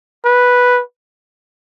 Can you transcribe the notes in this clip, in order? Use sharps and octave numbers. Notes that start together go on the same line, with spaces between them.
B4